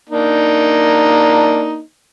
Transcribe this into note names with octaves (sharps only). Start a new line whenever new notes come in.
A#3 D4 D#4